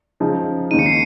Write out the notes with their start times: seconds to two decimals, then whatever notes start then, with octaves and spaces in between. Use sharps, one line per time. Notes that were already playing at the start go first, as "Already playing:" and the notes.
0.20 C#3 F3 G#3 D#4 G#4
0.71 D#2 C#3 G#3 D#4 D#7
0.79 C#7
0.86 C7